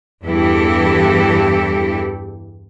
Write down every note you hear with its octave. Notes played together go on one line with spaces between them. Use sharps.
E2 G2 E3 E4 G4 A4